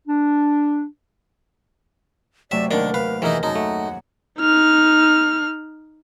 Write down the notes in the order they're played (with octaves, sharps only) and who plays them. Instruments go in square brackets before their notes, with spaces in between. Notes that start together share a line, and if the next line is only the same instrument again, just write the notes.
[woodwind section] D4
[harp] C3 F#3 A3 [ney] D5 [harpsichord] E5
[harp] D#2 F#5 A5 [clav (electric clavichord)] D#3 [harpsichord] D4 [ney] A#4
[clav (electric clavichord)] B4 [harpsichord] F5
[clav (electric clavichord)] D#3 A#4 [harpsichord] E3 D#4 [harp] G#4 [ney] E5
[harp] F#2 G#4 A#5 [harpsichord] D#4 [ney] A5
[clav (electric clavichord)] A3 [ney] F#5
[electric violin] D#4 F6